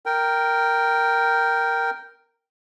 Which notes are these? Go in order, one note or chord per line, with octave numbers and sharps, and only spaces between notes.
A#4 G5